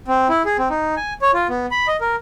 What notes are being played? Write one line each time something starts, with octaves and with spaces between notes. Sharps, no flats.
C4
E4
G#4
C4
D#4
G#5
C#5
F4
B3
B5
D#5
A#4